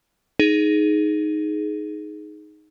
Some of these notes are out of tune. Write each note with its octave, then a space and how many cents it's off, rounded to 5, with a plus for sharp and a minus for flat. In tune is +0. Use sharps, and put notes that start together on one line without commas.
D#4 +0 G#4 +15